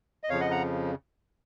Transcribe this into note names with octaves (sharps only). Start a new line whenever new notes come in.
D#5
F2 C#3 F3 C#5 F5
D#5 F#5
F#5 A#5